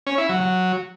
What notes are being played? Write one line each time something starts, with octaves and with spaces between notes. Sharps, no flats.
C#4
E4
F#3
F#3